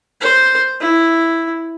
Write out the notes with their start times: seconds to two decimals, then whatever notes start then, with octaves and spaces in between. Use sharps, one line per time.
0.21 C5
0.80 E4